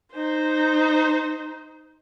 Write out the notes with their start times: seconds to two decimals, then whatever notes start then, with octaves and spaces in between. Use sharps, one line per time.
0.13 D#4 C5